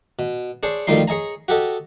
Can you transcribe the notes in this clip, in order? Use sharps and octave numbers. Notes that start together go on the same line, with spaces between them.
B2
D4 G#4 C5 C#5
D2 D#3 F3 G3 D#4 C6
G#4 C#5 D#5 G#5 A#5
F#4 G4 A4 D#5